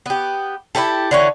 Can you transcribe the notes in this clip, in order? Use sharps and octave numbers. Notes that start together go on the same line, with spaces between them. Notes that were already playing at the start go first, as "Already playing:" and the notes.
B3 G4
E4 F4 G4 A4
D3 E3 C#4